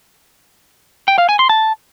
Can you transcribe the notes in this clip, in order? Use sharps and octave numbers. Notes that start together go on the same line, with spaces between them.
G5
F5
G#5
C6
A5